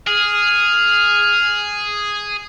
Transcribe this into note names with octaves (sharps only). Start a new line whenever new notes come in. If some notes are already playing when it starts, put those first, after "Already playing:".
G#4 F6